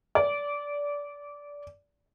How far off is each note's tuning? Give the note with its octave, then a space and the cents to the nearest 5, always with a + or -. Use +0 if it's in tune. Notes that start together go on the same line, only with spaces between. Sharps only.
D5 -20